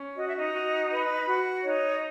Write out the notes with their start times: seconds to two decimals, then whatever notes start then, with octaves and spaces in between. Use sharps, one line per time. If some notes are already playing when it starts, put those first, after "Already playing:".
Already playing: C#4
0.17 F#4 D#5
0.27 E5
0.36 D#4 D#5
0.53 F#4
0.90 B4
1.27 F#4
1.63 D#4 C#5 D#5